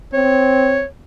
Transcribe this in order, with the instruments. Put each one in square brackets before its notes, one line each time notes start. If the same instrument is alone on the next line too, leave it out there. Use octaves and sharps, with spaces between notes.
[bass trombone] C4 [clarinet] C#5